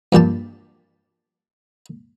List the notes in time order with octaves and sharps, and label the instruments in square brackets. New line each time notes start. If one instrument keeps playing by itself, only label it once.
[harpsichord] G2 A#2 G4 A5